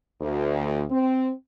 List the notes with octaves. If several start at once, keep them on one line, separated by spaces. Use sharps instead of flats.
D2
C4